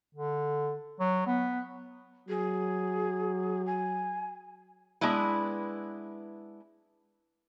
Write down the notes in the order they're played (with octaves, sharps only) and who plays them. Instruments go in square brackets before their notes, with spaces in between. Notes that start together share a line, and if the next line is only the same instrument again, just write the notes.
[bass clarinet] D3
F#3
B3
[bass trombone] F#3 [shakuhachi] G#4
[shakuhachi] G#5
[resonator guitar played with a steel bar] G#3 B3 D4 E4 B4